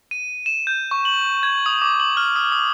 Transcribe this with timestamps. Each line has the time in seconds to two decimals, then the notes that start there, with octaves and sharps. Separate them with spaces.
0.11 D#7
0.46 E7
0.67 G6
0.91 C#6
1.05 F#7
1.43 G#6
1.66 D#6
1.82 D6
2.00 F#7
2.17 F6
2.36 D#6
2.52 D#6